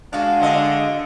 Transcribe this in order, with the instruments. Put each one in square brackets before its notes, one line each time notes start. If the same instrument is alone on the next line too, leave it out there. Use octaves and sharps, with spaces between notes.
[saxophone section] G#3 D4 [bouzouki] F#4 F5
[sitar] D3 D#5